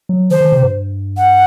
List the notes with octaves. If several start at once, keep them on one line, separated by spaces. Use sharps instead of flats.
F#3
D#3 C5
D#3
C3
G2
F#5